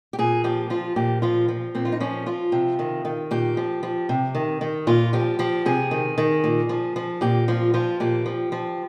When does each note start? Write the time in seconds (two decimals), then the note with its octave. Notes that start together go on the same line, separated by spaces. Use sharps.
0.13 G4
0.19 A#2 G#4
0.44 F3 G4
0.70 F3 F4
0.96 A#2 G4
1.22 F3 F4
1.48 F3
1.75 A#2 C4
1.85 F4
1.92 D#4
2.00 F3 C#4
2.26 F3 F4
2.52 C3
2.79 D#3
3.05 D#3
3.31 A#2 G4
3.57 F3
3.83 F3
4.09 C3
4.35 D#3
4.61 D#3
4.87 A#2 F4
5.13 F3 G4
5.39 F3 G4
5.65 C3 G#4
5.91 D#3
6.18 D#3
6.44 A#2
6.69 F3
6.96 F3
7.21 A#2 G4
7.48 F3 F4
7.74 F3 F4
8.00 A#2 G4
8.26 F3
8.52 F3